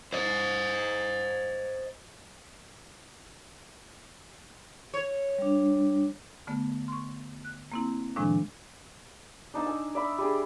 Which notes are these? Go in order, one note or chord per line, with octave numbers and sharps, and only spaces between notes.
C5 D#5
C#5
G3 D4
D3 A3 B3
C6 C#6
F#6
A#3 C4 E4
A2 C3 D#3 F3 G#3 D4
D4 D#4 A5 E6
G#5
D5 E5 B5
G3 D4 G#4